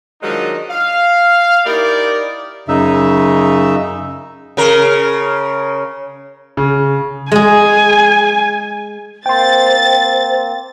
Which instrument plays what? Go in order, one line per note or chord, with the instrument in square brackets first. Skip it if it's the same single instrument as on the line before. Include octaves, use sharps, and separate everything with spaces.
[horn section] D#3 F3 F#3 G#3 D4 D#4
F5
D#4 E4 G4 A#4 D5
[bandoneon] F#2 C#3 D#4 E5
[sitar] C#3 A#4
[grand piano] C#3
[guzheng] G#3 G#4 [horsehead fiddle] G#5
[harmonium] A#3 C4 [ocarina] C5 [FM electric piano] G5 C6 [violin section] A6